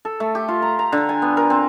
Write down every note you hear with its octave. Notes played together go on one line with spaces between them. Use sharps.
A4
A3
G4
F4
A#5
A#5
D3
G#5
B3
A#4
C4